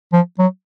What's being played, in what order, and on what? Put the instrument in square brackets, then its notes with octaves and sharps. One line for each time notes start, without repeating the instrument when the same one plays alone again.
[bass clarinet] F3
F#3